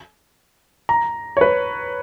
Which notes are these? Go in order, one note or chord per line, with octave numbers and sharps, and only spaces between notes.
A#5
C#5
B4